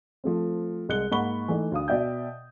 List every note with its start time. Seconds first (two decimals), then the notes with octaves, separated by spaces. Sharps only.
0.24 F3 A3 C4
0.89 C2 G#3 F#6 C#7 G7
1.11 G#2 A#3 F#5 B5 C#6 G7
1.48 E3 A3 D#4 D#5
1.72 D2 F5 D#6
1.88 B2 D5 E5 G5 G6